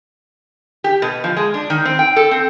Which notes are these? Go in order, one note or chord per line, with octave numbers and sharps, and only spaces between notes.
G4
B2
F3
G#3
D4
D#3
C4
G5
A4
C4